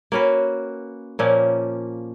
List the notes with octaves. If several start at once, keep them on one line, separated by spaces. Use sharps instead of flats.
A#3 C#4 F#4 B4
A#2 F3 A#3 C#4